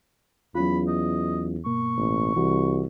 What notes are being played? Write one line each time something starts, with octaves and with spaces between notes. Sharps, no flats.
E2 F#3 C#4 F4 B5
D#5
G2 B2 A#3 C#6
A1
C2 E3 F#4